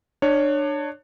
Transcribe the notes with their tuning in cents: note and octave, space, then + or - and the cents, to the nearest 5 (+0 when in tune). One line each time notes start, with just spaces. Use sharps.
D4 +25 C#5 +0